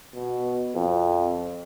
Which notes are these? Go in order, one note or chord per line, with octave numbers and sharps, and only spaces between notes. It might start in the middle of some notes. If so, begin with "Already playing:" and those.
B2
F2